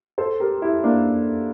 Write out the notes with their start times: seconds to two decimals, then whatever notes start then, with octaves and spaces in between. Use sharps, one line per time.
0.18 A4 C5
0.40 G4 A#4
0.62 E4 G4
0.84 A#3 D4